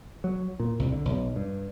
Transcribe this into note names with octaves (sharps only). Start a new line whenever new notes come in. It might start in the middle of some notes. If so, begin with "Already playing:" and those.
F#3
A#2
C2
D3
B1
G2